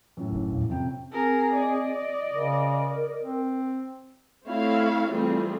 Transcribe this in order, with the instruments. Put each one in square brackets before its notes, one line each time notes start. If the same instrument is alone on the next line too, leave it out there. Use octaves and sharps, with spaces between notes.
[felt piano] F#2 A2
[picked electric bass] F#1 D4
E2 G2 A#2
[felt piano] F2 C3 G5 [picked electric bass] C#4
[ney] C4 [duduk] G#4 [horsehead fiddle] A#4
[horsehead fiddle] D5 D#5
[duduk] C#3 [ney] A#4
[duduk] C4
[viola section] A3 C4 E4 C#5 F5
E3 G3 A3 C4 F4 G#4